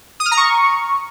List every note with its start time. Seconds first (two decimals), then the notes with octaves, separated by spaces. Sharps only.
0.20 D#6
0.26 F6
0.31 A#5
0.37 C#6